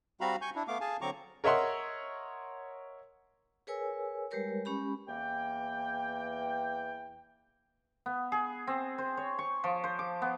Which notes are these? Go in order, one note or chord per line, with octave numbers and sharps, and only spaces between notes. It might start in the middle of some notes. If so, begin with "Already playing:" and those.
G3 C4 F#4 F5 A#5 B5
G#5 C#6 G6
D4 E4
A3 B3 F5 D6
G#4 F5 G#5 A5
D3 F#3 C4 A#5 C#6 D6
A#4 C#5 D#5 E5 F#5 C6
G#4 A#4 B4 C#5 G#5 E6
G3 G#3 G4 A#4 B4 C#5
G#3 C#4 G4 B5
E2 E3 A#3 G5
B3
G#4
C4
C5
C#5
C#6
F3
C5
D6
B3